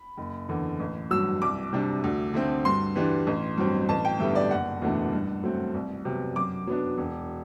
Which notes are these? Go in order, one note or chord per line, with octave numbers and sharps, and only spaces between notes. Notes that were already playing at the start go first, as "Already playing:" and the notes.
Already playing: B5
F#1
E2 D3
A1
G2 F#3 E6
C2 D6
C3 G3 D4
D2
D3 A3 C4
G2 C6
E3 G3 D4
A1
G2 F#3 C4
A1 A5
G5
G2 D3 G3 B3 E5
D5
F#1 F#5
E2 B2 A3 D4
G2
F#3 A3 C4
C2
C3 F#3 B3
F#2 D6
F#3 B3 D4
E1